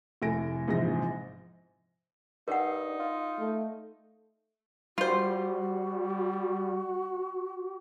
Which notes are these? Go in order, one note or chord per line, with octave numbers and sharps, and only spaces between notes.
F1 A2 A4 G#5 A#6 D7
A#1 E2 G#2 C3 F3 A#6
G2 D#4 A#4 F#5
F4
A3
G3 F4 F#4 C5